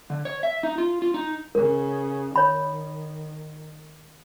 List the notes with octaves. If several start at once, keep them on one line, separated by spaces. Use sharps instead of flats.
D3
C#5
E5
D#4
F4
F4
D#4
C#3 A#4
D#3 C#5 B5